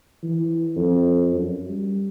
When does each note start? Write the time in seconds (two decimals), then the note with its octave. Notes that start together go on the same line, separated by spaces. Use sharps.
0.23 E3
0.76 F2
1.35 F#2
1.70 G3